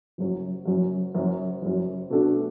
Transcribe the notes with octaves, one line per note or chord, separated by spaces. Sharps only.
F#1 F#2 F#3
F#1 F#2 F#3
F#1 F#2 F#3
F#1 F#2 F#3
B2 A3 D4 F#4 A4